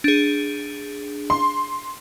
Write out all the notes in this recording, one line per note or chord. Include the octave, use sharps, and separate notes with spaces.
D4 G#4
C6